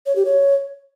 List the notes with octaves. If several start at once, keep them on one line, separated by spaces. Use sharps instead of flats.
C#5
G4
C#5